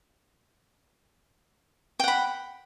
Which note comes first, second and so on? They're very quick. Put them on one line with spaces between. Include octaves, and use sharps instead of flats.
G5 F#5 B5